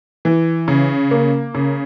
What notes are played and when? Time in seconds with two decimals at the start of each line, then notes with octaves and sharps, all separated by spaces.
0.25 E3
0.68 C#3
1.11 A#3
1.55 C#3